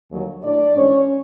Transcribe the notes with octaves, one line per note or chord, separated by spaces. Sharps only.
D#2 D3 F#3
A2 F#3 D4 D5
G#2 E3 C#4 C#5